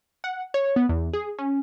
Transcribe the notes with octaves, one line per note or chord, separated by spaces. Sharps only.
F#5
C#5
B3
E2
G#4
C#4